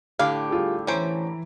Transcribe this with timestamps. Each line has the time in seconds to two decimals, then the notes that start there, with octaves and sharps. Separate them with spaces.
0.19 A2 D3 G4 F5
0.50 G3 F4 G#4
0.87 E3 C#4 E4 C5 A#5 D7